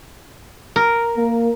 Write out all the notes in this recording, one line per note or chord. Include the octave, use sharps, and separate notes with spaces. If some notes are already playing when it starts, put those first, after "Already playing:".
A#4
A#3